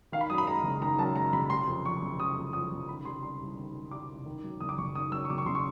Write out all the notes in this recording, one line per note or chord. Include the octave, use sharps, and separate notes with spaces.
D#3 F5
B5
F#2 D#6
B5
G#3 A#5
F#1
D#3 A#5
F#2 A5
G#3 A#5
F#1 B5
C3 C6
F2
F3 C#6
F#1
C3 D#6
F2
F3 D#6
F#1
D#3 B5
C3 C6
G3 C6
C2
D#3
C3
G3 D6
C2
D#3
F#2
F#1 D#6
D6
F#1 C#6
D#3 D#6
F#2 E6
C#6
F#1 D6
C#6
F#1 C6
C#6